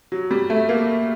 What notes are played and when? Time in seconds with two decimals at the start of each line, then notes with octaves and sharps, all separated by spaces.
0.12 F#3
0.31 G3
0.50 A3
0.69 A#3